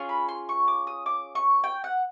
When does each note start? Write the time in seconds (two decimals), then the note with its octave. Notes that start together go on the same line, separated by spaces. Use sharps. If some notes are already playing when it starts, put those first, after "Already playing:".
Already playing: C#4 F4 G#4
0.09 B5
0.28 C6
0.49 C#6
0.68 D6
0.87 D#6
1.06 D6
1.35 C#6
1.64 G5
1.84 F#5